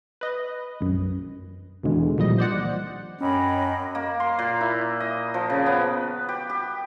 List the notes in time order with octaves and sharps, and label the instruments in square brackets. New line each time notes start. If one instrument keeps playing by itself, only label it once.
[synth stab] B4 D#5
B1 F#2
E2 B2 D3 E3 G#3
C#2 A#2 D#3 F3 G3 D#5
C5 D5 F#5
[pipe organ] F#2 [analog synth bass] C#4 [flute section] C#5 G5 B5 [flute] D#5
[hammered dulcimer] A#3
C6
A#2
E4
D#5
F3
C#3
B3
G4
G4